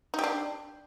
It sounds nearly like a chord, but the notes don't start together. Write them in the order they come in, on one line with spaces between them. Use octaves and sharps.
D#4 G4 D4